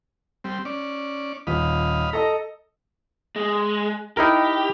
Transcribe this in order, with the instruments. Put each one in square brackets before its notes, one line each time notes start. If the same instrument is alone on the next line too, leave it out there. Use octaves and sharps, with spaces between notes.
[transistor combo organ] G3 C4
C#4 D5
[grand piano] D#1 [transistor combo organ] D#5 F5 B5
[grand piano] A4 D#5 [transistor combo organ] A#5
[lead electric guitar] G#3
[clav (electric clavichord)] D#4 E4 A#4 [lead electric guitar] G4